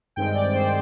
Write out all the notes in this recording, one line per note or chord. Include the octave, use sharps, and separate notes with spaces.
G2 D#3 G#3 C4 G5
D5
C5